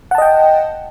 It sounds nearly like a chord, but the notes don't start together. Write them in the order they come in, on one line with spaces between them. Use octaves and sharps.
F#5 A5 D#5 G5